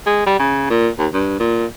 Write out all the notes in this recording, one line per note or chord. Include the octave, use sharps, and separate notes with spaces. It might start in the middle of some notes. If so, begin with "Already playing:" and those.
G#3
G3
C#3
A#2
D#2
G2
A#2